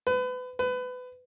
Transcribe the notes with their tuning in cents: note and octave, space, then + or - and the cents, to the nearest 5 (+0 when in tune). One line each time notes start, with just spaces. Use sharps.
B4 +30
B4 +25